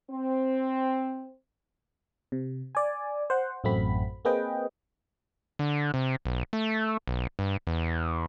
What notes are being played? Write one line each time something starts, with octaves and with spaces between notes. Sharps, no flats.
C4
C3
D5 G#5
C5 F#5
A1 F#2 A3 C4 F#4 B5
A#3 C4 G#4 B4 D#5 G5
D3
C3
B1
A3
B1
G2
E2